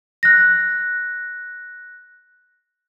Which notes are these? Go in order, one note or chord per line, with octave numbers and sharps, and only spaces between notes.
F#6 A#6